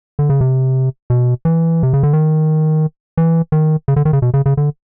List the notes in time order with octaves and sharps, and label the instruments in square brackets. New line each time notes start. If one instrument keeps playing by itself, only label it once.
[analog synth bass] D3
C#3
C3
B2
E3
C3
C#3
D3
D#3
E3
D#3
C#3
D3
D#3
C#3
B2
C#3
C#3
D3